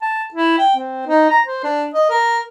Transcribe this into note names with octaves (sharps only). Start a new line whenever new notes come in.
A5
E4
G5
C4
D#4
A#5
C5
D4
D#5
A#4